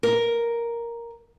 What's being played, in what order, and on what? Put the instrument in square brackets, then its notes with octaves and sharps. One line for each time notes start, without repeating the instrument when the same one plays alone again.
[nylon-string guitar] A#4